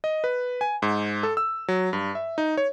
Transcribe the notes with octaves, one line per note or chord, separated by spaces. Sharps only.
D#5
B4
G#5
G#2
A4
E6
F#3
G2
E5
D#4
C#5